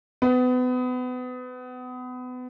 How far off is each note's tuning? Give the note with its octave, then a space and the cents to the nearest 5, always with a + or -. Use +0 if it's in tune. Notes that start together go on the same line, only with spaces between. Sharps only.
B3 +30